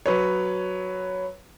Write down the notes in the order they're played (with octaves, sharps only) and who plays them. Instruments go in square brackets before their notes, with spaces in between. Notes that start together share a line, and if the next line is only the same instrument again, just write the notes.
[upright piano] F#3 B4 C#5